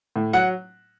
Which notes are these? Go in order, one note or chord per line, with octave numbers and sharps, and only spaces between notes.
A2
F#3 F#5